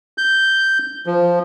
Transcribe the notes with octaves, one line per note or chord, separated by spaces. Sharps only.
G6
F3